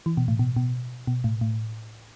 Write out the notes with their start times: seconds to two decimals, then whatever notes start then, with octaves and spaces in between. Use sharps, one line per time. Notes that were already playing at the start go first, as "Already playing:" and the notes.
0.06 E3
0.17 B2
0.28 A2
0.39 B2
0.56 B2
1.07 B2
1.24 A2
1.41 A2